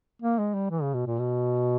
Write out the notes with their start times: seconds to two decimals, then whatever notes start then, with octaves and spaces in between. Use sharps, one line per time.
0.22 A#3
0.38 G#3
0.54 G3
0.70 E3
0.82 C#3
0.94 B2
1.06 A#2
1.19 B2